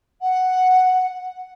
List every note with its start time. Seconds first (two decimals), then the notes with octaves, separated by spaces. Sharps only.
0.21 F#5